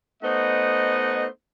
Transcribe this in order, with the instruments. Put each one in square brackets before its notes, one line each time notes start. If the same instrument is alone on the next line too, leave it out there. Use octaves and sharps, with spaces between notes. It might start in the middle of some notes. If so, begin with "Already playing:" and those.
[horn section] A3 B3 D#4 C5 D#5 F#5